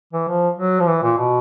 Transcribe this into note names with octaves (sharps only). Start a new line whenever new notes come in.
E3
F3
F#3
F3
E3
A#2
B2